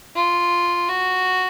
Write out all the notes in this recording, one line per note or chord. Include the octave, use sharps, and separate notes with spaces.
F4
F#4